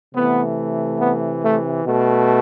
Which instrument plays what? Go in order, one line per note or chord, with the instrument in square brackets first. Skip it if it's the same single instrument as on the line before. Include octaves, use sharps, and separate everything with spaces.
[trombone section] C3 E3 A3 B3
B3
A3
B2 A3